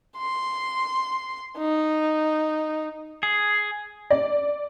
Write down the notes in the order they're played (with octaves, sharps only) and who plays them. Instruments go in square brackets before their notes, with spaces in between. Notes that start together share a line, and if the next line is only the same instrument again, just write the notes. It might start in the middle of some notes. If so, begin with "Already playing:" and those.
[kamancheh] C6
D#4
[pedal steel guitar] G#4
[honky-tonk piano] D5